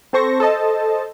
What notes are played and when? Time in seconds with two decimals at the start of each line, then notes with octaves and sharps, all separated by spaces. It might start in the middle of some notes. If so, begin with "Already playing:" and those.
0.13 C4 A4 C5 C#6 A#6
0.40 A4 C5 D#5 A5